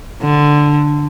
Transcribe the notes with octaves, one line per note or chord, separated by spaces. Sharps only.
D3